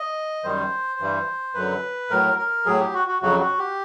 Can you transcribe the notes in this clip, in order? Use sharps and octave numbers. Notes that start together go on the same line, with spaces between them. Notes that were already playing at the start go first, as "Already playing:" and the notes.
Already playing: D#5
F#2 D#3 G3 C5
G2 E3 G3
F#2 D3 F#3 B4
A2 F#3 A#4
A#4
A2 F#3 G#4
G4
F#4
F#4
F2 C#3 F#3 F#4
F#4
G4